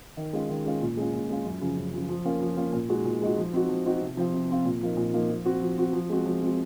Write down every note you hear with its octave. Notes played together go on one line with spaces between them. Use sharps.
D#3
G#3 C#4 F4
D#3
G#3 C#4 F4
A#2
G#3 C#4 F4
A#2
G#3 C#4 F4
F#2
C#3 F3
F#2
C#3 F3
F3
A#3 C#4 F4
F3
A#3 C#4 F4
A#2
G#3 D#4 F#4
A#2
G#3 D#4 F#4
F3
C4 D#4 F#4
F3
C4 D#4 F#4
C3
F3 C4 F4
C3
F3 C4 F4
A#2
F3 A#3 D#4
A#2
F3 A#3 D#4
F3
C4 F#4
F3
C4 F#4
F3
G#3 C4 F#4
F3
G#3 C4 F#4